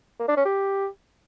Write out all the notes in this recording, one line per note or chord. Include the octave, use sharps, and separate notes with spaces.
A#3
D4
C#4
G4